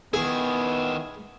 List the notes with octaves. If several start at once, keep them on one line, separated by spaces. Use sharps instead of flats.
D#3 B3 E4 G#4